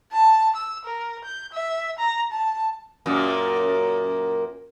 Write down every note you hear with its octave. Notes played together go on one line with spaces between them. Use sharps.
A5
E6
A#4
G6
E5
A#5
A5
F#2 A#2 A#3